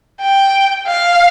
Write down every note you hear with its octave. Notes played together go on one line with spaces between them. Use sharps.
G5
F5